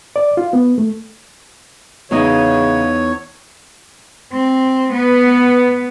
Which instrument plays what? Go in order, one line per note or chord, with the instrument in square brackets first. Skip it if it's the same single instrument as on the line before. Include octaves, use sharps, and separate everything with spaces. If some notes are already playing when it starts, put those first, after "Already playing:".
[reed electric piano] D5
F4
B3
A3
[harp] E2 D#4 D#6 [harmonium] C#3 [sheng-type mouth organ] C#5
[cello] C4
B3 B4